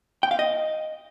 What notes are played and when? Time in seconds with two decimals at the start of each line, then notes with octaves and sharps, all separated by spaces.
0.23 G5
0.31 F5
0.39 D#5